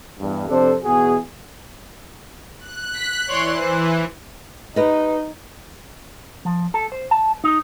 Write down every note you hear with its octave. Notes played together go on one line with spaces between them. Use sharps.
E2 G2
F2 C3 D4 A4 C5
E2 B2 F#4 G#4
F#6
B6
E3 C#5 D5 C6
C5
D#4 G4 B4 D#5
F3
A4
C5
A5
D#4